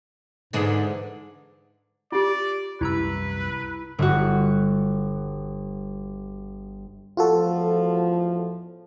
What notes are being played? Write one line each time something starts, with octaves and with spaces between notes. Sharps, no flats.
G#2 D3 E3 G#3
F4 G4 D5
C2 F#2 E4 B4 A#5 E6
G1 F#4
E2 A2 F3 F4 F#4 A4